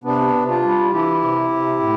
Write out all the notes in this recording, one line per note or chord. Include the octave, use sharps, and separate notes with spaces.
C3 B3 D4
C3
D4 F4
G3
E3 E4 G4
C3
C3
A2